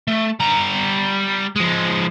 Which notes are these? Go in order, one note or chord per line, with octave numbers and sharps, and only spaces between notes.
A3
G3 A#5
F3 G#3